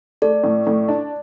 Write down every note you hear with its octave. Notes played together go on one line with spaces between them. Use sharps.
A3 D5
A2
A2
D4